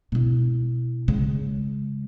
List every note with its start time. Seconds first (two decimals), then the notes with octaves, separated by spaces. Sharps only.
0.12 B2 E4
1.08 C#3 G#3